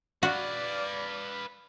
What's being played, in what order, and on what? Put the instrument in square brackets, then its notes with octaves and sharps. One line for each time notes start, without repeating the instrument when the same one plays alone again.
[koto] F#4 [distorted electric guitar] B4 F5 [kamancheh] D5